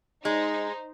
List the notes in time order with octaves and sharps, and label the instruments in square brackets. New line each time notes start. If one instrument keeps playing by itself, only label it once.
[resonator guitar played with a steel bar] G#3 [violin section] D#4 C5